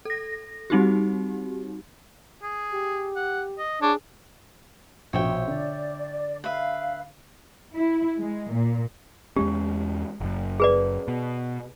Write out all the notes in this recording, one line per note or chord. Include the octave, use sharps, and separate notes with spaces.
A4 A#6
G3 C4 D#4 F#4 G4
G#4
G4
F#5
D#5
D4 G#4 C#5
A#1 B2 C#5 E5 G5
D3 D5
B4 E5 F5
E4
G#3
A#2
E2 G#3 C#4 G4
F#1 F#2
G#4 B4 D5
B2